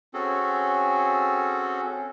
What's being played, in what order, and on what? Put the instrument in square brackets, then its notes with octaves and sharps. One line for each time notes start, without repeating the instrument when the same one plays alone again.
[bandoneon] C4 C#4 F#4 G#4 A4